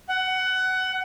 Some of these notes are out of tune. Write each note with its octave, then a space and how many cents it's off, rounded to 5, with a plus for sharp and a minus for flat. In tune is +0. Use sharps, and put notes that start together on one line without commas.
F#5 +20